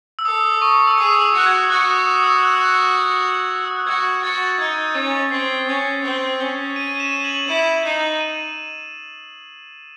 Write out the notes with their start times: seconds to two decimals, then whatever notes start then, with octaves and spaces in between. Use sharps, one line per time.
0.19 E6
0.25 A4 D#6
0.52 D#6
0.62 C#6
0.87 E6
0.98 G#4 D#6
1.22 E6
1.34 F#4 F#6
1.46 G#6
1.70 F#4 F#6
1.88 D#6
2.06 D#6
2.24 E6
2.42 F#6
2.53 E6
2.64 F#6
3.65 E6
3.76 F#6
3.87 F#4 G#6
4.23 F#4 A6
4.59 D#4 G#6
4.95 C#4 A6
5.31 C4 C7
5.68 C#4
6.04 C4
6.40 C#4
6.76 D#7
7.00 E7
7.24 F#7
7.48 E4 E7
7.85 D#4
8.20 D#7